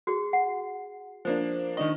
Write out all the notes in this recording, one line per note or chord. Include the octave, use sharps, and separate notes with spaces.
F#4 G#4
F#5
F3 A#3 D4 C5
D#3 D4 D#5 C#6